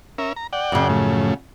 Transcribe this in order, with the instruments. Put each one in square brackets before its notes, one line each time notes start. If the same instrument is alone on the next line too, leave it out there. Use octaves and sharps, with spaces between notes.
[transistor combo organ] C#4 A#4 E5
A#5
D5 F#5 G5
[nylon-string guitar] F#2 C#3
[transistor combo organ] A2 F3 A3